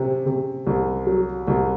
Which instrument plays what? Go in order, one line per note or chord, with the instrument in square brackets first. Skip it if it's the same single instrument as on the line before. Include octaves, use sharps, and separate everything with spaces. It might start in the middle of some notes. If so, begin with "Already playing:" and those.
Already playing: [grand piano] C3
C3
C2
F#3
C2